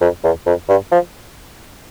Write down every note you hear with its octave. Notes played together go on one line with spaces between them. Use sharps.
F2
E2
F2
G2
F3